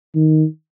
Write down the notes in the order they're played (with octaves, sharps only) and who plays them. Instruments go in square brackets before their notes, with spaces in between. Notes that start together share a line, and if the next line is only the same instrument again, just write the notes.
[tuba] D#3